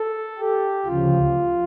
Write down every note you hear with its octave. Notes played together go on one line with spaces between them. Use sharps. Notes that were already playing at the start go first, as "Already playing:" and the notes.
Already playing: A4
G4
D2 C#3 F3 F4